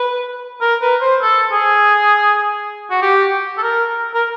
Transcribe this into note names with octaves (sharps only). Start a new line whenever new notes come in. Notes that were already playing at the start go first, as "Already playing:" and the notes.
Already playing: B4
A#4
B4
C5
A4
G#4
F#4
G4
A4
A#4
A#4